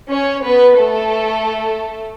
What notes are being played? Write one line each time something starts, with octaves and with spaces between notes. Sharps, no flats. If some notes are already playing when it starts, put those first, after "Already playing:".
C#4 C#5
B3 B4
A3 A4